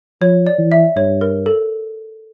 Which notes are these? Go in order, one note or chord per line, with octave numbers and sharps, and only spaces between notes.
F3 C#5
D5
E3
E5
G2 C#5
A#4
A4